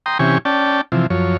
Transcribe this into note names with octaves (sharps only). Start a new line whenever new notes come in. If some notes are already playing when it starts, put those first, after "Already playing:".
G5 A#5 C6 D#6
C3 E3 C#4 G4 G#5 C#6
C#4 D5 G5 A5
C3 E3 F3
F#2 F3 C#5